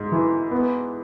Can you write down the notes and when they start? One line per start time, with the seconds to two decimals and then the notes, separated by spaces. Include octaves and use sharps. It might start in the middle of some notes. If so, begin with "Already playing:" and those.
Already playing: G#2
0.12 E3
0.51 B3